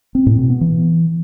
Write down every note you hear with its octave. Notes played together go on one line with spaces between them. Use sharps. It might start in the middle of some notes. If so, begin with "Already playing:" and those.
C4
A2
B2
B3
E3